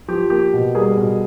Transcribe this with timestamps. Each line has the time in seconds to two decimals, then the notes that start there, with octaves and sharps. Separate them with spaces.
0.08 F3 G4
0.30 A#3 G4
0.53 B2
0.75 G3 G#4 A#4
0.97 B2